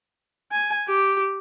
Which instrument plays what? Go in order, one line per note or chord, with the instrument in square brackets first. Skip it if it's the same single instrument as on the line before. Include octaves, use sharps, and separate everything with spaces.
[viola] G#5
G4